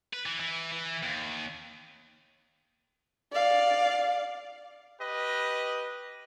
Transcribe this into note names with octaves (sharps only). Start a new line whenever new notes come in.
B4
E3
E3
E3
D#2
D5 F5
G4 B4 D#5